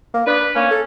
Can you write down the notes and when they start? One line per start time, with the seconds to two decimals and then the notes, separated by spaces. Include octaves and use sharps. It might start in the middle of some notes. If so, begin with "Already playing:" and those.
0.14 A#3
0.27 D4 B4
0.55 A#3 C#4
0.71 A4